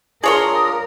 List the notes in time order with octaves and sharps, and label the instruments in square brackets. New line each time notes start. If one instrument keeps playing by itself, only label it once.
[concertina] D4 F4 D5 [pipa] G#4 C#5 C6 [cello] A#4 [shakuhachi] D#6